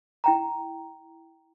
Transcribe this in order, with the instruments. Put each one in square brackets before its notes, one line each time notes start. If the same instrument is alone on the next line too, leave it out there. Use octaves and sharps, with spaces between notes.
[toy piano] E4 G5 A#5